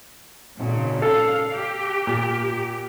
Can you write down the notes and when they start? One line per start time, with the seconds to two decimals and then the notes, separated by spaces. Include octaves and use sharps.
0.60 G#1 A#2 C#3
1.02 A4 F5
1.56 G4
2.07 A#2